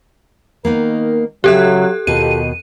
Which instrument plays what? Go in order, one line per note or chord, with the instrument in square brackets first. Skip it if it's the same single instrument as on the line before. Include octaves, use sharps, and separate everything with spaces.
[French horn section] D#3 A#4 [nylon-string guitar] A#3 B3 D#4
[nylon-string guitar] C#3 E5 [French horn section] F#3 [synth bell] G4 A4 F#6
[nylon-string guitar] D#2 B2 [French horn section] F4 G4 A4 [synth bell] D#7